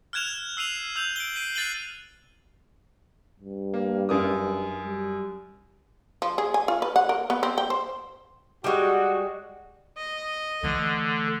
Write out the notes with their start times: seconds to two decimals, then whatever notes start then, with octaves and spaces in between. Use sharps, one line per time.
0.13 F6 F#6 G#6 E7 F7
0.57 E6 C7 D#7 F7
0.96 E6 G6 F7
1.16 D7 G7
1.36 C7 D#7
1.55 F#6 A6 C7 D#7 F#7 G7
3.40 G2
3.74 A#3
4.09 F#2 A#4 D#6
4.84 G3
6.22 F3
6.38 G#4
6.54 G#5
6.68 F4
6.82 B4
6.96 F#5
7.09 A#4
7.30 B3
7.43 C4
7.58 G5
7.70 C5
8.64 G3 G#3 F#4
9.97 D#5
10.63 D3 E3 A3